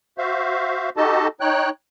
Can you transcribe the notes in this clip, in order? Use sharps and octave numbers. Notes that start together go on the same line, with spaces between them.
F#4 C5 E5 F5
D#4 F#4 G4 A4 D#5 A5
D#4 C#5 G5 F#6